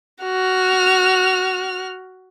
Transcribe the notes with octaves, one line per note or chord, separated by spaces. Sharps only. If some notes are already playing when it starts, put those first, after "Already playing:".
F#4 F6